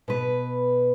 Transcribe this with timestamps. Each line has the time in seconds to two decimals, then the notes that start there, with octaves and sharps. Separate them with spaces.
0.08 B2 B4